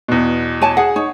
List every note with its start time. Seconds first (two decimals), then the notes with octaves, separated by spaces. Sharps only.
0.08 E2 B2
0.62 C#5 G#5 A5
0.77 G#4 F#5
0.96 D#4 C#5